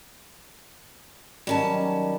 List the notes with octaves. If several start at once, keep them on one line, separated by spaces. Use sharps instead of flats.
D#3 F#3 G3 C#4 A5